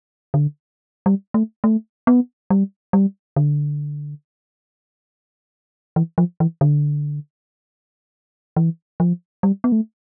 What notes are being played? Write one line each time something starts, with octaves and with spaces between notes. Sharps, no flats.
D3
G3
A3
A3
B3
G3
G3
D3
E3
F3
E3
D3
E3
F3
G3
B3
A3